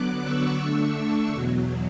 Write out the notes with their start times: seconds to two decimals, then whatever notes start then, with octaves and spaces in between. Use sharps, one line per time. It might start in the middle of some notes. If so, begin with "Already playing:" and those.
Already playing: D3 F#3 B3 D6 F#6
0.24 C#6 E6
0.61 D3 A3 D4
1.32 E2 B2 F#3